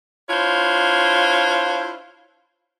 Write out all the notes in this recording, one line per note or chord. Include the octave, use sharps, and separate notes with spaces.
D4 E4 F4 C5 C#5 F5